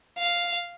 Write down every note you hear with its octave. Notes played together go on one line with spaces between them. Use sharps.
F5